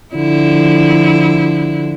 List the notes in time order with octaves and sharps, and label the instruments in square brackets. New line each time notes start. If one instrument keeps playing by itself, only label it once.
[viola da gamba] D3 F3 E4